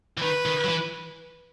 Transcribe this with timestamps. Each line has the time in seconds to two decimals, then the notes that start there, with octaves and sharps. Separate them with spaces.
0.18 E3
0.22 D#3 B4
0.46 D#3
0.64 F#3
0.69 E3